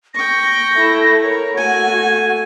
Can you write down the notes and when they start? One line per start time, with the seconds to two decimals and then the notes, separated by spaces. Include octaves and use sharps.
0.14 G5 C#6 A#6
0.75 A3 E4
1.22 A#4 C#5
1.57 A3 F#4 G#5 G#6